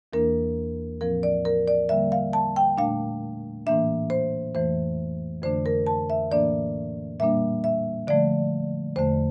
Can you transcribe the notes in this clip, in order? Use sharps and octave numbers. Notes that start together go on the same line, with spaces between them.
E2 E3 A#3 D4 A#4
A2 F3 C4 A#4
D5
A#4
D5
D3 G3 A#3 E5
F5
A5
G5
A#2 A3 D4 F5
A2 E3 A#3 D4 E5
C5
F2 E3 A3 C5
F2 D3 A3 D4 C5
A#4
A5
E5
A2 E3 A#3 D4 D5
A#2 G3 A#3 D4 E5
E5
D3 F3 A3 D5
E2 D3 A3 C5